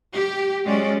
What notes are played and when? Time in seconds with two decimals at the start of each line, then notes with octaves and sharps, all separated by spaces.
0.14 G4
0.64 F#3 G#3 C#4 D5